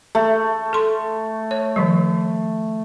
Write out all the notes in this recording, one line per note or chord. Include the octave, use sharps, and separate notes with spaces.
A3
A4 C6
C#5
D#3 F3 G3